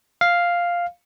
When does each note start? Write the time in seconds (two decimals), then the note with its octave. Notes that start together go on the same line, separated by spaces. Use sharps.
0.21 F5